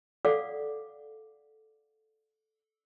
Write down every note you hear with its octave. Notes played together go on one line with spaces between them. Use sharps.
A4 D5 F5 F#5 D6